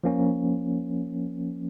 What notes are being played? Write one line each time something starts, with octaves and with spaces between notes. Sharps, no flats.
F3 A#3 C#4